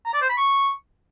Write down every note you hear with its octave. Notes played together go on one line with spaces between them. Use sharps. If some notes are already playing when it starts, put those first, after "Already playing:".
A#5
D5
C5
B5
C#6